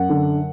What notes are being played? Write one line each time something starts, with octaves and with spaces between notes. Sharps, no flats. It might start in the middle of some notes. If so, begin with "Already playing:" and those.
Already playing: F#2 F#5
D3